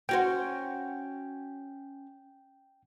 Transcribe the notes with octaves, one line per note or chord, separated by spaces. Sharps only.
C#4 F#4 C5 G5